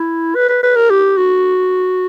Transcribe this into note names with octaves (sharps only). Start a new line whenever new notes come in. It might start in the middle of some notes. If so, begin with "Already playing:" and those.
Already playing: E4
B4
B4
B4
A#4
G4
F#4